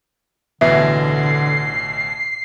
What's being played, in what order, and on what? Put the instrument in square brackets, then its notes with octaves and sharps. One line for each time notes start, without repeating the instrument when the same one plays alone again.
[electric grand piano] A1 B2 E3 [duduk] D3 [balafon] E5 [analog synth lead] C7